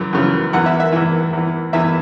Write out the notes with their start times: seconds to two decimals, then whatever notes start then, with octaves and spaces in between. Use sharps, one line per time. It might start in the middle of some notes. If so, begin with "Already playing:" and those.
Already playing: F#2 C#3 E3
0.13 F#2 C#3 E3
0.53 E2 E3 F#5
0.66 E5
0.80 E5
0.92 E2 E3
1.33 E2 E3
1.73 E2 E3 E5